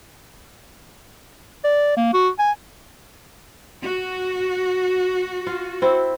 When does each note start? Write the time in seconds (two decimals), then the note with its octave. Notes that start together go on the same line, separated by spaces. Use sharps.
1.64 D5
1.97 A#3
2.14 F#4
2.39 G#5
3.83 F#4
5.47 F4
5.82 C4 E4